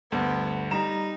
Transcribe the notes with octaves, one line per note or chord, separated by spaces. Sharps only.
D2 G2 B3
G3 D#4 A#5 E7